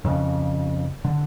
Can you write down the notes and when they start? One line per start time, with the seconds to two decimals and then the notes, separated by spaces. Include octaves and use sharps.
0.05 F2 C#3
1.05 D3